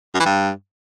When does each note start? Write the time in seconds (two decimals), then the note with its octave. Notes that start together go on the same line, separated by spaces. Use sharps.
0.14 F#2
0.20 E3
0.26 G2